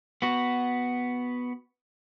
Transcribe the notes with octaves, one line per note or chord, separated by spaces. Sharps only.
B3 F#4